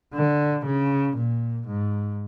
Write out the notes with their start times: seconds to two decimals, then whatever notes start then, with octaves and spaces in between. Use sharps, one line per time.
0.14 D3
0.66 C#3
1.17 A#2
1.67 G#2